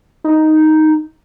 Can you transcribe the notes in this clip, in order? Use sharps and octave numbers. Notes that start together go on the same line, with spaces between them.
D#4